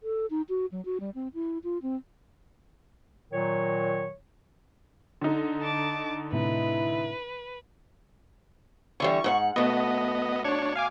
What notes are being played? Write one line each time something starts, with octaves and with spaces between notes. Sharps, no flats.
A4
D#4
F#4
F#3
F#4
G3
C4
E4
F4
C4
A#2 D#3 F#3 C#5
D3 D#4
A5 D6
A2 C3 E4 B4
D3 E3 G3 C#6
G#2 C5 F#5
B2 A3 B3 D#5
D4 C#5 C#6
F5 G#5 D6